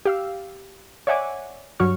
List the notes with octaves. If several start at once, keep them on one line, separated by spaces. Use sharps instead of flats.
G4 F5 E6
C#5 D5 E5 F#5 G#5 D6
G2 F#3 F#4 C#6 F6